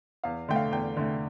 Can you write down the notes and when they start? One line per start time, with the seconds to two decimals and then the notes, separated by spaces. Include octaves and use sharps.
0.24 E2 F5
0.48 D3 A3 G5
0.56 F5
0.72 E2 G5
0.97 D3 A3